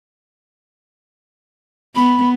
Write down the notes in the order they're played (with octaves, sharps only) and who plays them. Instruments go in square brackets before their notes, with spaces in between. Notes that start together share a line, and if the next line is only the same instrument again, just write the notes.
[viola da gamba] B3 [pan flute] B5